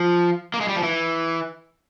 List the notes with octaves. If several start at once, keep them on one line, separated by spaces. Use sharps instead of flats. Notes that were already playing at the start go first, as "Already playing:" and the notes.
Already playing: F3
A#3
G#3
G3
F3
E3